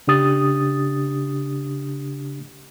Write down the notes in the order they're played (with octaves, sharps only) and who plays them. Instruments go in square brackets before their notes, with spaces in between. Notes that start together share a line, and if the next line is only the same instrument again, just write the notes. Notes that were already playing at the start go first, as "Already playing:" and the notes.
[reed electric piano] C#3 D4 G4 D#6 A6